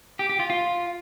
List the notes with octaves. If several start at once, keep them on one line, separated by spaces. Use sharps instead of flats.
G4
G4
F4
F4